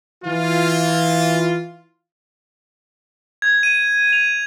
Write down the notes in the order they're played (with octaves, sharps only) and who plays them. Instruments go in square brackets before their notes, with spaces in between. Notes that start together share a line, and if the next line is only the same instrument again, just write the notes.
[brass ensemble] E3 F4
[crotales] G#6
D#7
F7